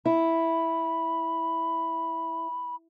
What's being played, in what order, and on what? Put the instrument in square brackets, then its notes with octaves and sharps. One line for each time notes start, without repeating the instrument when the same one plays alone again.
[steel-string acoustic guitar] E4 [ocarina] B5